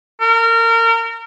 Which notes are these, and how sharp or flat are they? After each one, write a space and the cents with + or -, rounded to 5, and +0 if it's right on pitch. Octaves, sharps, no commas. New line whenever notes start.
A#4 -30